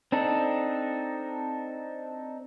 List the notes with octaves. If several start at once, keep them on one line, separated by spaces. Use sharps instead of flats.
C4 D4 D#4 A4